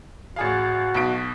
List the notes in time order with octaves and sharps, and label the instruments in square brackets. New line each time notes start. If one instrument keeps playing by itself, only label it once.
[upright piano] A1 G#4 F5 [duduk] F#4
[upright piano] B1 B2 D7